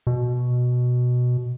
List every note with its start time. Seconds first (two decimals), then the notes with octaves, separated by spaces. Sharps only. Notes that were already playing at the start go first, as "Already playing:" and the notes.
0.07 B2